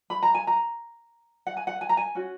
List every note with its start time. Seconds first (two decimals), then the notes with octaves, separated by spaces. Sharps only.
0.10 B5
0.23 A#5
0.34 G#5
0.47 A#5
1.47 F#5
1.57 G#5
1.67 F#5
1.81 G#5
1.89 A#5
1.97 G#5
2.15 C#4 F#4